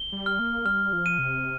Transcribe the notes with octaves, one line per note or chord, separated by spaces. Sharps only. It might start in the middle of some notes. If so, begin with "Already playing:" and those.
Already playing: G7
G3
F6
A#3
G3 F6
F3
D#7
C3